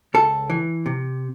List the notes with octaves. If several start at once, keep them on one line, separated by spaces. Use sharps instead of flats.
C#2 A4
E3
C3